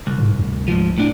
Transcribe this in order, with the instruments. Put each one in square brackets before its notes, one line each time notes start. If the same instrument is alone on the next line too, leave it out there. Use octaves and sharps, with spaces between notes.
[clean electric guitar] C2
[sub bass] G#2
D2
[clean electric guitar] G#2 F3
A2 D4